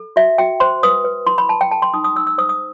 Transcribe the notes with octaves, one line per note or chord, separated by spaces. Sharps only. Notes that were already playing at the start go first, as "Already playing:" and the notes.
Already playing: A4
F#4 E5
F#4 G5
C5 C6
B4 D#6
B4
E4 C6
B5
E4 A5
G5
A4 A5
C6
D#4 D#6
D#6
D#4 E6
E6
C5 D#6
D#6